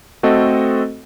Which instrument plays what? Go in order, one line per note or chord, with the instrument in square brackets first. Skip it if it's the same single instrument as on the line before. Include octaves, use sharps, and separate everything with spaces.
[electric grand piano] A3 C4 F#4 A4 D#5